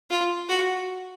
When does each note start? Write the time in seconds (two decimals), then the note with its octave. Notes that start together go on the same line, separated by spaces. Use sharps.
0.10 F4
0.48 F#4